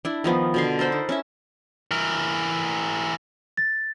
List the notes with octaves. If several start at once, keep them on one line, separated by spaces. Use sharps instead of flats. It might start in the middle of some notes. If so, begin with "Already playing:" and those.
D4 E4
D#3 F3 B3 D#4
B2 D3 C6
A4 A#4 C5 B5
D#4
C#4 E4 E5
E3 A#4
A6